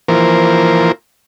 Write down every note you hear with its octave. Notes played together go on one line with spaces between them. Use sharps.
E3 F3 A#3 A#4 C5